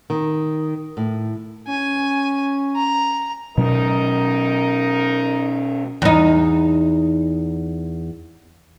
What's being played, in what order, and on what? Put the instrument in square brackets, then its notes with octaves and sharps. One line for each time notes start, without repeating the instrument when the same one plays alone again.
[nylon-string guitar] D#3
A2
[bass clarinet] C#4 [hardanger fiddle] G#5
[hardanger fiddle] A#5
[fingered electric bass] B2 F#3 C#4 [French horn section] D#4 A#4
[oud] E2 D#4